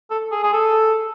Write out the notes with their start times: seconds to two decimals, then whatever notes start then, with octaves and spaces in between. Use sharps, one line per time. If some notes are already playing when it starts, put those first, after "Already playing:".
0.10 A4
0.32 G#4
0.43 G#4
0.53 A4